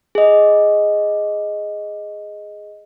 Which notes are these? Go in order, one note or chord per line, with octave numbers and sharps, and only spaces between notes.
G#4 D#5